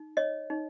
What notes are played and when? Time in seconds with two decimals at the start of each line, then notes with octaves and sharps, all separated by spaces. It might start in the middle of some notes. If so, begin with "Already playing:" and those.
Already playing: D#4
0.17 C#5 D#5
0.50 D#4